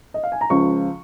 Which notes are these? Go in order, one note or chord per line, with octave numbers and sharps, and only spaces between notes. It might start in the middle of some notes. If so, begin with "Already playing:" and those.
D#5
F5
G#5
A#5
C#2 C#3 F3 C#6